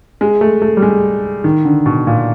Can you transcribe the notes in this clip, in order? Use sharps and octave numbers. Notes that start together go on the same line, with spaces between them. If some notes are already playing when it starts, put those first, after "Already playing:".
G#3
A3
A3
G3
G#3
D#3
D3
B2
A#2